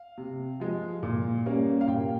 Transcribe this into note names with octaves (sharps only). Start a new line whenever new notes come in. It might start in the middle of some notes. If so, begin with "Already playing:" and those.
Already playing: F5
C3
F3 G#3
A#2
G3 A#3 C#4
F5
A#2 G5